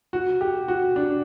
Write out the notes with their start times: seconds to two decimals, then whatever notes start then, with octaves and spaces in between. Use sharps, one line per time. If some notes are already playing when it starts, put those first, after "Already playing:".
0.13 F#4
0.41 G4
0.68 F#4
0.96 D4